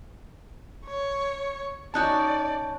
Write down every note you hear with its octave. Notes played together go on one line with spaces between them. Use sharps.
C#5
C#4 D#4 F#4 D5 A5 F#6 G6